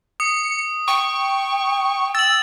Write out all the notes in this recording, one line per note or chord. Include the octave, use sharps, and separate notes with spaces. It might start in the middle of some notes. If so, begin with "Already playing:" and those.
D#6 C#7
G5 C#6
E6 A6 F#7